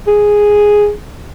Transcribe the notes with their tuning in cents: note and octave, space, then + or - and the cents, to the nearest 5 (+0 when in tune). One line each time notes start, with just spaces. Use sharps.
G#4 +0